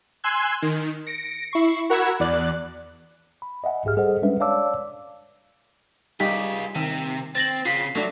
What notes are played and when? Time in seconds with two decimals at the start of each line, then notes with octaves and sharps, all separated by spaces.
0.24 G#5 C6 E6 F#6 G#6
0.62 D#3
1.07 A#6 C#7 D7
1.51 E4 C#6 C7
1.90 F#4 A#4 F#5 B5 E6 G#6
2.20 E2 D5 F#6
3.42 B5
3.64 D#5 E5 F#5 G#5
3.84 B1 G#2 G4 G#4 F6
3.97 G3 G#4 A4 C5 D#5 F#5
4.22 G3 G#3 C#4 D4 B4 E5
4.40 C#5 D5 F5 A5 D6 E6
6.20 G3 D#4 F4 G4 G#4 B6
6.75 C3 D#3
7.35 C4 A6 A#6 F#7
7.65 C#3 F4 B6 C7
7.95 F#3 A3 D4